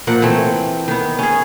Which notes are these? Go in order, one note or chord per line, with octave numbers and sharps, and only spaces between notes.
A#2 F3 A#4 F#5
E3 A3 C4
D#3 B3
C#4 G#4